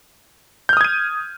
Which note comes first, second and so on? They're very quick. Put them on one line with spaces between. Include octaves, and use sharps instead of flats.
G6 F6 D#6 G#6 D#7